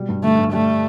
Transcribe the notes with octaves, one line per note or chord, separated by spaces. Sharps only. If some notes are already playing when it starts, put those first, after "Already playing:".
Already playing: B2 G3
G2
D3 A3
G2
G3 A3